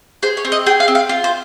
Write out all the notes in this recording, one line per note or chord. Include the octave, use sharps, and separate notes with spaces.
G#4 C5
C#5
C4
D#5
G#4 G5
F5
C4
F5
F4
C5